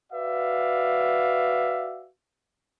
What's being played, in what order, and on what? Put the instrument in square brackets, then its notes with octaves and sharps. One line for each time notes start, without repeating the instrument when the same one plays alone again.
[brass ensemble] F#4 B4 D5 E5 F5